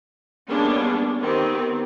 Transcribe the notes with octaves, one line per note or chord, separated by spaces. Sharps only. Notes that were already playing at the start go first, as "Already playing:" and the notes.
G3 G#3 A#3 B3 C#4 D4
D#3 B3 C4 G4